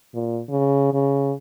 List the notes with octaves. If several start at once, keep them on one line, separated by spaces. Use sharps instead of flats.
A#2
C#3
C#3